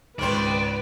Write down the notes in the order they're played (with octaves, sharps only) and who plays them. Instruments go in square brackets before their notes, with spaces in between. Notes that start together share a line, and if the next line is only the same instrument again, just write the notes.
[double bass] C#2 G#2 [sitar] D#3 C4 C5 [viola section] B4 [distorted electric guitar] D5